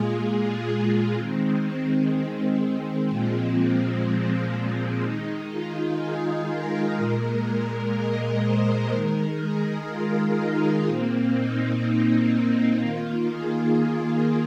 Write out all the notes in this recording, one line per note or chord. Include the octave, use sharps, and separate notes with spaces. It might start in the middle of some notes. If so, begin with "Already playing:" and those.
Already playing: A#2 G#3 F4 G#4
F4
D#3 G#3 C4
C4
A#2 F3 G#3 C4
C4
D#3 G#3 D#4
F4
G#4
A#4
A#2 G#3
D#5
C5
D#3 G#3 A#4
G#4
F4
D#4
A#2 A#3 C4
D#4
D#3 A#3 F4
G#4
G#4